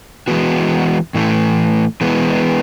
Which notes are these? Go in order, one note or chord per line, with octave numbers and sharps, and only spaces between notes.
E3 G#3 B3 F#4
A2 E3 A3
E3 G#3 B3